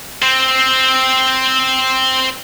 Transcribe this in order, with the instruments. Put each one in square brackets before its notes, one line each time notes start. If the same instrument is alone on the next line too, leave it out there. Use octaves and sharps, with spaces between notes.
[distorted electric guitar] C4 C5